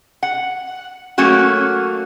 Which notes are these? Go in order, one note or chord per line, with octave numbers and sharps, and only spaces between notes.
F#5
F#3 A3 A#3 C#4 F#4